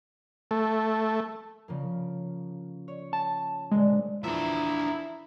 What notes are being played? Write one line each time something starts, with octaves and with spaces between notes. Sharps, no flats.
A3
C#3 F3 A#3
C#5
A5
A#2 D3 G#3 C4
E2 A#2 F3 D4 E4 E5 A#5